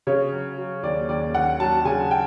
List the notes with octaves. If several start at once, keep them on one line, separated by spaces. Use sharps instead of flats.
C#3 C#5
F#3
F#3
D#2 D5
D#2 D5
D#2 F#5
F#3 A5
C#3 G#5
G5